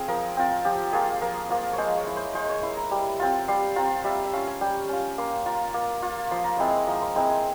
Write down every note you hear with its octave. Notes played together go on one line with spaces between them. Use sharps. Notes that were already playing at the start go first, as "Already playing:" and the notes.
Already playing: C4 F4 G#4
F3 A#4
C4 F4
F3 G4
A#3 F4 G#4
F3 A#4
A#3 F4
G#3 C5 C#5
C#5
E4
C5
G#3 C5
C#5
E4 C6
A#5
G3
C4 F4
G3 C6
C4 F4 A#5
G3 E5
E5
C#4 F4 F5
G#5
G3 G5
C#4 F4
A#3 C6
F4 A#5
A#3
F4
F3 C6
A#5
G#3 C4 E4 C6
F3 A#5
C6
G#3 C4 E4 A#5
G#5